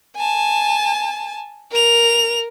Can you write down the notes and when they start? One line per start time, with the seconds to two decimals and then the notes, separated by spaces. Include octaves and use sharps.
0.17 G#5 A5
1.72 A#4 F7